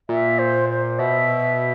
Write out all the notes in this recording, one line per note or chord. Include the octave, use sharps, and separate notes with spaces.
A#2 E5
C5
C5
B2 E5